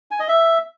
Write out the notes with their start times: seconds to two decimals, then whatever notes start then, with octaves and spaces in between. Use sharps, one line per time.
0.11 G#5
0.20 D#5
0.28 E5